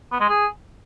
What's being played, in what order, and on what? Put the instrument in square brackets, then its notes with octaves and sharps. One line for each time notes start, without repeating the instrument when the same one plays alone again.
[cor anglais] B3
G#3
G#4